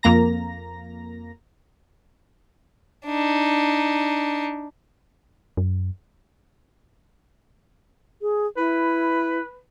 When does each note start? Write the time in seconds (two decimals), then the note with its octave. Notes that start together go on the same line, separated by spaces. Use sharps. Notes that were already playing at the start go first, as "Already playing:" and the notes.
0.03 F2 A#3 A#5 A#6
3.06 D4 D#4
5.57 F#2
8.22 G#4
8.57 E4 B4